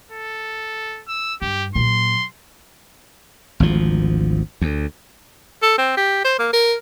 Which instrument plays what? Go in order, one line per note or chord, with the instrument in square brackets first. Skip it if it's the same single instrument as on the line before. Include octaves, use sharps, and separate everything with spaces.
[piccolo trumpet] A4
E6
[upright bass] G2 [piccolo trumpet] G4
[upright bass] A#2 F#3 [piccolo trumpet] C6
[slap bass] G#1 D2 F3
D2
[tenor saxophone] A4
C4
G4
C5
A#3
A#4